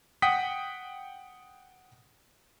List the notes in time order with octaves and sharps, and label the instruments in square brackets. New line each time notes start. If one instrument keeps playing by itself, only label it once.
[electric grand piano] F#5 G5 D#6 B6